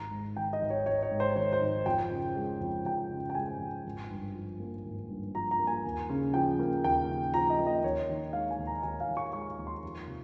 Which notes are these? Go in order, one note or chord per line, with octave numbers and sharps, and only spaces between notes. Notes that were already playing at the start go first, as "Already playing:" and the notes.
Already playing: G#1 A#5
G#2
D#3 G5
D#5
G#1
C#5
G#1 C#5
C#5
G#2
C5
D#3 C#5
C5
G#1
F2 G5
C#3
G#3
F2
F2 G5
C#3
G5
G#3 G#5
F2
G#1
G2
F3
A#3
G#1
G2
F3 A#5
A#5
A#3
G#5
D#2
C#3
F3 G5
A#3
D#2 G5
C#3
F3 A#5
D#5
A#3
D#5
D#2 C#5
D#3
G#3 F5
G#5
D#2
A#5
D#2 G#5
F5
D#3
C#6
G#3 C#6
D#2
C6
F2
C3